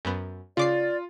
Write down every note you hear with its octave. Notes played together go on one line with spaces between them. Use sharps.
F#2 B3
C#3 F4 D5 D6 C7